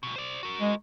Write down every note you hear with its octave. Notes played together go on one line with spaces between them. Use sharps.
D2 B2
C5 D5
F#4 A#4
G#3